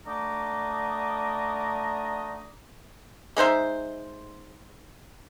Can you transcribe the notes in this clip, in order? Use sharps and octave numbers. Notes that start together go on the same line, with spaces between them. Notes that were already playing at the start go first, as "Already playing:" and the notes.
D3 A3 D4 D#5 A#5 D6
G#3 D#4 C5 E5